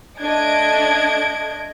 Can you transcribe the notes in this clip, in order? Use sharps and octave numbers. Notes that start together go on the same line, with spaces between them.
A3 D4 D#5 G#6 D7